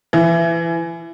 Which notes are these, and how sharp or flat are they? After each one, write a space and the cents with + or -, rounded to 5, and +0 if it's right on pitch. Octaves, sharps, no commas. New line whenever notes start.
E3 +25